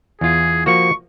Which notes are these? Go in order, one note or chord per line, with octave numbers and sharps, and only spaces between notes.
E2 F4 G#4
F3 A#3 F#4 C#6